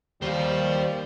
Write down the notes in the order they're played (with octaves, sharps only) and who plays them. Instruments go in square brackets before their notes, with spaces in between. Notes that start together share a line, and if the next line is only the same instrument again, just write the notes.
[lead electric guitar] D#2 [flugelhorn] G3 [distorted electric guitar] C5 F5